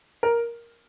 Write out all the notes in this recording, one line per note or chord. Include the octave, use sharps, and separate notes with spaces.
A#4